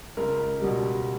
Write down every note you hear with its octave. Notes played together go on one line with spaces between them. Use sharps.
C#2 A#4
B2 G3